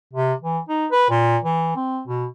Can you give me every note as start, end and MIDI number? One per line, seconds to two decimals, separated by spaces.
0.13 0.34 48
0.42 0.59 52
0.69 0.86 63
0.91 1.06 71
1.10 1.38 46
1.43 1.72 52
1.76 2.02 60
2.07 2.26 47